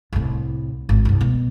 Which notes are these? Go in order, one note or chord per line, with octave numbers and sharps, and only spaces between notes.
C2 A2
G#1
C2 G2
B2